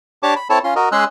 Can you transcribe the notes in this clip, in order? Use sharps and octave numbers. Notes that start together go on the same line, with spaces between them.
D4 G4 C#5 A5 D6
B5
C4 E4 A4 C#5 A5
C#4 F4 C6
F#4 A#4 D#5
G#3 C#4 G#4 C6 E6 F#6